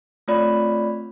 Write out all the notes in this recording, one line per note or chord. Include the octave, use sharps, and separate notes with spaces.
A3 C4 F4 C#5 D5 B5